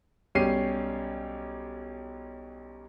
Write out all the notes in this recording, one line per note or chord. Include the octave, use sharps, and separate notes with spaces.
B1 G3 C#4 G4 C7 D#7